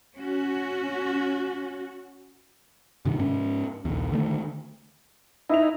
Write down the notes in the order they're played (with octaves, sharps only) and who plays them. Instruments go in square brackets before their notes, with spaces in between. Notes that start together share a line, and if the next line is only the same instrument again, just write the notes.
[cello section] C#4 F#4
[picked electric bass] G2 C3 D#3
G#2 C#4
A#1 D#2
D3 D#3 A3
[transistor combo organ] D#4 [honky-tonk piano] E4 E5 F7